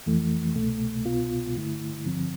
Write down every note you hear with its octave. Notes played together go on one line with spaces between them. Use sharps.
F2 E3 A3
C2 B2 A3
C2 B2 B3 F4
G2 D3 A3 E4
G2 D3 F3 C4